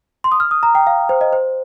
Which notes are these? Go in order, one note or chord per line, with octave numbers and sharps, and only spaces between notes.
C6
D#6
F6
D#6
A#5
G5
F5
C5
D#5
C5